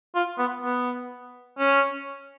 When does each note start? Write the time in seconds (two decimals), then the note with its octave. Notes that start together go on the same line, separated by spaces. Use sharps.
0.15 F4
0.38 B3
0.62 B3
1.58 C#4